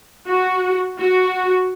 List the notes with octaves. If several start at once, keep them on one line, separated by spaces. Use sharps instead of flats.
F#4
F#4